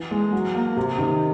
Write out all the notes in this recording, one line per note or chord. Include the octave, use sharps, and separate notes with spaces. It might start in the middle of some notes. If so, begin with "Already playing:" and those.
Already playing: E3
G#3
F#3
A#3
C3
D#3